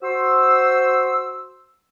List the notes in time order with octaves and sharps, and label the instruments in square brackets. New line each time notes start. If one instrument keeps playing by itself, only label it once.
[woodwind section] F#4 C5 C6 E6